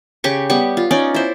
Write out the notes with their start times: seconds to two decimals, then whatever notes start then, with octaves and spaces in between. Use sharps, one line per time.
0.24 C#3 G4 C#6
0.50 G3 B3 C#6
0.77 F4
0.91 C#4 D#4 D5
1.14 E4 C5